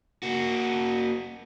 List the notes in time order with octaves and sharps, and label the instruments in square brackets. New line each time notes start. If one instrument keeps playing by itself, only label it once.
[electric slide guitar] A#3 F#4